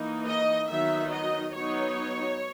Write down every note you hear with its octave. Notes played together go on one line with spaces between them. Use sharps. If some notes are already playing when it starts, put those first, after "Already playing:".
Already playing: E3 A#3 D#4
D#5
D#3 F#3 B3 D#4 E5
D#5
F#3 B3 D#4 C#5